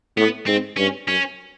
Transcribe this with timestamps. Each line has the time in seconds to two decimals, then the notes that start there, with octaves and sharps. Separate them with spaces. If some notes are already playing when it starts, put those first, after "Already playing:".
0.17 A2 B3
0.47 G#2 C4
0.77 G2 C#4
1.07 F#2 C#4